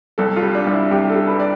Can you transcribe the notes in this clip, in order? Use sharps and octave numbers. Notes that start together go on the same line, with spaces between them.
C2 A4
F4
G3
D4
C2
E4
C2 G4
A4
G3
B4
D5